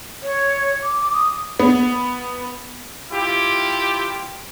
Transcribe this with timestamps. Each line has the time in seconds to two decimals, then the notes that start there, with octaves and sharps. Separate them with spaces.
0.23 C#5
0.83 D6
1.13 D#6
1.60 B3
3.12 E4 F4 G4